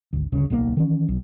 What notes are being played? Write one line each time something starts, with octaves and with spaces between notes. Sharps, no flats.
G#1 D2
G1 D2 C#3
D1 B1 A#2 A#3
D#3 E3 C#4
B1